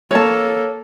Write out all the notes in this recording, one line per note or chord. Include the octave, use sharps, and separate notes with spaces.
A#3 A4 C#5 A5